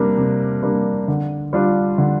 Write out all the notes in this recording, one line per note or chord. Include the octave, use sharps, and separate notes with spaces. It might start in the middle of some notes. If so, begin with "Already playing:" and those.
Already playing: C3 G3 A#3 D4
C3
G3 A#3 D4
D3
G3 D4 F4
D3